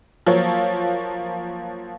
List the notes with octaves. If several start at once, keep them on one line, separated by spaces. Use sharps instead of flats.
F3 F#3 A#3 C#5